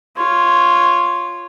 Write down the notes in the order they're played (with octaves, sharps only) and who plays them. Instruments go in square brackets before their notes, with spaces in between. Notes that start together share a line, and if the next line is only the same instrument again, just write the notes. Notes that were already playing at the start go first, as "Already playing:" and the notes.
[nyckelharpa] F4 C#5